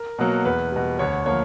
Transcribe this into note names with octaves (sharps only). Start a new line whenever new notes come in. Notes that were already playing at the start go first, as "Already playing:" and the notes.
Already playing: A#4
B2 F#3 A#3
E2 B4
B2 G3
D2 C#5
F3 A#3 C#5